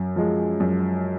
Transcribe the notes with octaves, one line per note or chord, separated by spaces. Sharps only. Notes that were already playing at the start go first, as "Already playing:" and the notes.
Already playing: F#2
F3 G#3
F#2